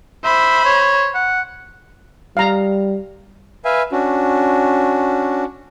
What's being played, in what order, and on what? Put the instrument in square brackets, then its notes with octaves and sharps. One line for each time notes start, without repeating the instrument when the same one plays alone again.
[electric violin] C5 B5 [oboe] E5
[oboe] C#5
F#5
[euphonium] G3 [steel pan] F5 A#5
[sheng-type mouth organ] B4 E5 F5 G#5
C#4 D4 F#4